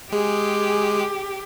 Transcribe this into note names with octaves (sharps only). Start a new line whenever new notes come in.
G#3 G4 G#4